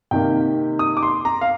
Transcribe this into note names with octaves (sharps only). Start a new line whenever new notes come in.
C3 D#3 A#3 G5
D#6
D6
C6
A#5
F5